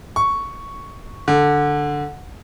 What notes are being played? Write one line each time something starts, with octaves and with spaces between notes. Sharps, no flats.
C#6
D3